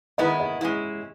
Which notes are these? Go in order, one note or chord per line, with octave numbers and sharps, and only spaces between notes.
D#3 G#3 B3 E4 D#5
D#5
G#3 C#4 E4